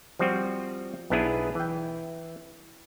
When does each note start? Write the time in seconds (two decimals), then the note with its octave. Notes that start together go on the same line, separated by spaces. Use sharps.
0.19 F3 G3 C4 F#4
1.10 B1 B3 D4 E4 G#4 B4
1.55 E3 G5